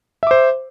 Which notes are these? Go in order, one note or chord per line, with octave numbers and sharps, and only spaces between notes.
C5 E5 D6